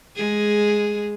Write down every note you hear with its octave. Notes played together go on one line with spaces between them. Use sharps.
G#3 G#4